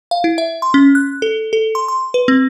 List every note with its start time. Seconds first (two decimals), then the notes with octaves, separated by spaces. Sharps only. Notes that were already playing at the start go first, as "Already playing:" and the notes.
0.11 F5
0.24 E4
0.38 E5
0.62 C6
0.74 C#4
0.95 F#6
1.22 A4
1.53 A4
1.75 C6
1.88 C6
2.14 B4
2.28 C4